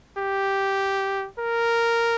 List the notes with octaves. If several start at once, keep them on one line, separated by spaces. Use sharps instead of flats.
G4
A#4